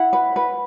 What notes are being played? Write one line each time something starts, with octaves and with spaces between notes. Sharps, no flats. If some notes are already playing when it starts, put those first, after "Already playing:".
Already playing: E4 F#5
B4
B4